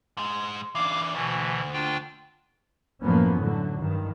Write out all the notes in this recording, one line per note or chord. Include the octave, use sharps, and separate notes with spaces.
G#2 G#3
E3 D4 F5 D6
D2 B2 E3
D4 F4 G5
F#2 A2 F3 A#3 B3 C#4
A2 D3 F#3
G2 D#3